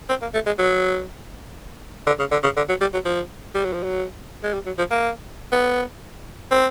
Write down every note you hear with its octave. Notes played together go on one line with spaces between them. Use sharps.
C4
A#3
A3
G#3
F#3
D3
C#3
D3
C#3
D3
F#3
G3
F#3
F3
G3
F#3
F3
F#3
G#3
G3
F#3
F3
A#3
B3
C4